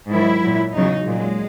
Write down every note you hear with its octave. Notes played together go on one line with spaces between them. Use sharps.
G#2 D#3 F#3 E4
A#2 F#3
E2 C#3 F#3 D#4
A#2 F#3 G#3